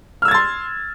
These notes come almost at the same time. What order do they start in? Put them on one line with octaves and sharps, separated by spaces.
F6 E6 G#6 A6 C6